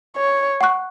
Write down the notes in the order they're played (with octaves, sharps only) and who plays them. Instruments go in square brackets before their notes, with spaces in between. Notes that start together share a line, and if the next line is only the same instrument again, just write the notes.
[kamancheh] C#5
[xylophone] F#5 C#6 F#6